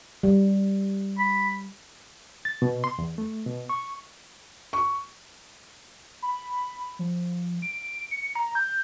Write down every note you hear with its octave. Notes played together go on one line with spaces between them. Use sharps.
G3
B5
A6
B2
C6
E2
A3
B2
C#6
C#6
B5
F3
D7
C#7
A#5
G6